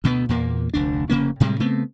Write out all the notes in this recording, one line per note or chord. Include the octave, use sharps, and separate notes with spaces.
D2 B2 F#3 B3
E2 A#2 A#3
F1 D2 D4
F1 C#3 A#3 C#4
A2 C3 G3 G#3
C#3 A3 B3 C4